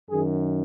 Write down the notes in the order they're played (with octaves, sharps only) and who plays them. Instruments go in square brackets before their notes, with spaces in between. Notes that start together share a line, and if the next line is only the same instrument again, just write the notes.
[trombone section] F#2 D#3 G#4